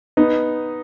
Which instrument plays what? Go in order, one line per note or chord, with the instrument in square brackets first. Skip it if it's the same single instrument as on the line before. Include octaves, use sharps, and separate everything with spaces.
[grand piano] B3 D#4